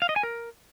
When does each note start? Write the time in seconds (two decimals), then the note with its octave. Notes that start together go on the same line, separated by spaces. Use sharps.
0.02 F5
0.09 D#5
0.16 G#5
0.23 A#4